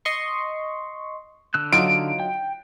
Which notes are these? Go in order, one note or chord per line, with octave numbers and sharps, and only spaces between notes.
D#5 C6 C#6
D3 E6 F#6
F#3 D#4 F4 D7
G5